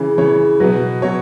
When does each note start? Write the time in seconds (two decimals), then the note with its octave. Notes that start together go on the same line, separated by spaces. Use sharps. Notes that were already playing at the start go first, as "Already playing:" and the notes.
Already playing: C#3 E3
0.18 C#3 E3 C#5
0.60 B2 F#3 B4
1.02 B2 F#3 C#5